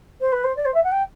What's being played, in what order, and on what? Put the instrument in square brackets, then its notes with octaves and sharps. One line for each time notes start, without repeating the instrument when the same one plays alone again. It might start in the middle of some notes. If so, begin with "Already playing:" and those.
[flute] C5
B4
C5
D5
C5
E5
F#5
G5